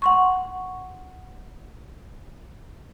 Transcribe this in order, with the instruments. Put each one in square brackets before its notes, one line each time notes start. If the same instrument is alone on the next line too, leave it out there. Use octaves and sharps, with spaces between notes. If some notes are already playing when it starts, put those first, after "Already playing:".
[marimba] F#5 C6 C#6